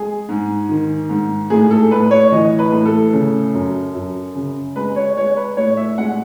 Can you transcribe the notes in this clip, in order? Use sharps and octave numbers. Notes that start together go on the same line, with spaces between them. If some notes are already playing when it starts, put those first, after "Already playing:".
Already playing: G#3 G#4
G#2
D#3
G#2
A2 G#4
A4
A2 B4
C#5
E3 D#5
B4
A2
A4
C#3
F#2
F#2
C#3
G#3 B4
C#5
G#3 C#5
B4
A2 C#5
E5
G#3 F#5